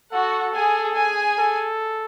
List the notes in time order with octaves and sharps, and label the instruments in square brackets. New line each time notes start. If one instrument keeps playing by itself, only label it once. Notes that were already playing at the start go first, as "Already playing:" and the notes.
[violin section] F#4 F#5 [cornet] A4
[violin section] G#4 G#5
G#4 G#5
[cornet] A4